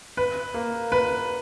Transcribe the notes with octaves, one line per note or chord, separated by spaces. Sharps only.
B4
A#3
B4